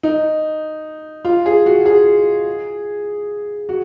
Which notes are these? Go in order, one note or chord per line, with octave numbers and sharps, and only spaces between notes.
D#4
F4
G#4
F#4
G#4
F#4